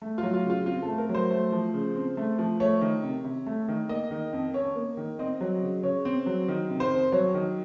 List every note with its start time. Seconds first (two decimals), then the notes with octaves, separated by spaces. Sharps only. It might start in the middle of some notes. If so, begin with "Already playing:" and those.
0.02 A3
0.18 F#3 F4
0.34 F4
0.45 C#3 F4
0.66 C4 F4
0.82 A4
0.88 A3
0.98 A#4
1.09 F#3
1.15 C5
1.31 A3
1.52 F3
1.74 C#3
1.96 C4
2.17 A3
2.39 F3
2.60 A3 C#5
2.81 D#3
3.03 C3
3.24 C3
3.46 A3
3.68 D#3
3.89 A#3 D#5
4.11 D#3
4.33 F2
4.54 C#4 C#5
4.75 A#3
4.97 D#3
5.19 C4 D#5
5.41 F#3
5.62 C#3
5.83 C#3 C#5
6.05 C4
6.26 F#3
6.48 D#3
6.69 C3
6.80 C5
6.91 F2
7.12 F#3 C#5
7.34 D#3